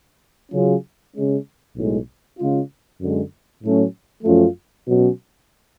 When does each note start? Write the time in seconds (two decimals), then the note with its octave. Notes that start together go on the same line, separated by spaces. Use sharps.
0.52 C#3 F#3 C#4 F4 G#4
1.14 C#3 G#3 C#4
1.76 B1 A2 G#3
2.38 C#3 G#3 C#4 F4
3.00 F#2 D3 G#3
3.63 A2 F#3 A3 C#4
4.24 F#2 F3 A3 C#4 F4
4.86 B2 F#3 C#4